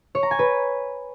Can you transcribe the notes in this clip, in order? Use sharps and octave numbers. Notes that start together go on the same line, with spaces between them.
C#5
A#5
G#5
B4